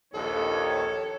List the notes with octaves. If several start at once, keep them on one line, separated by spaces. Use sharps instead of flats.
A#1 D#2 A4 C#5